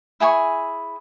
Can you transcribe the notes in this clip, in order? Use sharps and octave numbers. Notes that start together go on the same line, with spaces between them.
E4 G#4 G#5 C#6